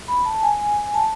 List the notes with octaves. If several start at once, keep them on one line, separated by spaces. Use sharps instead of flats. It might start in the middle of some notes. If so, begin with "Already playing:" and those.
B5
A5
G#5
A5